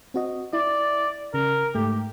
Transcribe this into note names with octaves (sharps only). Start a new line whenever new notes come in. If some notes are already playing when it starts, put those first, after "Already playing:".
C4 F#4 D#5
E4 D5
C#3 A#4
G#2 A3 G4